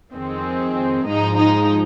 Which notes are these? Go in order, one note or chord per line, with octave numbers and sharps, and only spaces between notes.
F2 D#3 G#3 C4
G#2 F3 G#3 D#4
D#4